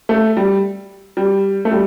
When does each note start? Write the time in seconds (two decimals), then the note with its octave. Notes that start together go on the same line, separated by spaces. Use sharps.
0.09 A3
0.37 G3
1.17 G3
1.65 A3
1.71 G3